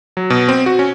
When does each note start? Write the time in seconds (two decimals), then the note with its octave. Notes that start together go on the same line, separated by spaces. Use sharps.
0.17 F#3
0.30 B2
0.49 C4
0.66 F#4
0.79 C#4